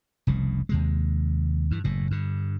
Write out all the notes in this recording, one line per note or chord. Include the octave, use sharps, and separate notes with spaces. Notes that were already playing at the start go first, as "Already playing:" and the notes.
F1 C2 C#3
D#2 C3 G#3
G2 E3
F#1 A2
G2 D3